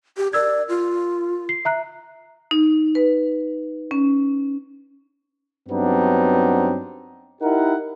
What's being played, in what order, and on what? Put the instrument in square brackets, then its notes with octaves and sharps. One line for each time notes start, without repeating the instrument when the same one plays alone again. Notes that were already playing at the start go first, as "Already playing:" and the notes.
[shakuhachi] G4
[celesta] A#4 E6 G#6 [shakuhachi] D5
[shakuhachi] F4
[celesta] C7
E5 A#5 F#6
[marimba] D#4
B4
C#4
[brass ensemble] G2 F#3 B3 C4 D4 D#4
D#4 E4 G4 A#4 F#5